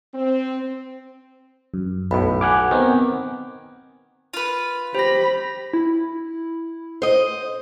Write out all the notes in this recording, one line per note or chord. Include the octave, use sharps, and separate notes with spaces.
C4
F#2
B1 A2 B5
F#5 G#5 D6 F6
D#3 B3 C4
F4 B4
G4 C5 B5 A#6
E4
C5 D#5